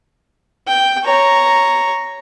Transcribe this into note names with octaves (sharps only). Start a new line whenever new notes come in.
G5
C#5 A#5